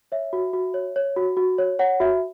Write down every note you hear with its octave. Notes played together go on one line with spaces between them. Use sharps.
C#5 E5
F#4
F#4
C#5
C#5
F#4
F#4
C#5
C#5 F#5
F#4 E5